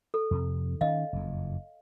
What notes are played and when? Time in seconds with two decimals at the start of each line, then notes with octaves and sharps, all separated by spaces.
0.14 A4
0.31 F2 C3
0.81 D#3 C#4 D#5 F5
1.13 F#1 F2